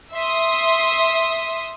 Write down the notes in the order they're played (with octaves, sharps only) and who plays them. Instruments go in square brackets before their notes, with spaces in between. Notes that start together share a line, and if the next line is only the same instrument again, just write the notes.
[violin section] E5 C6 D#6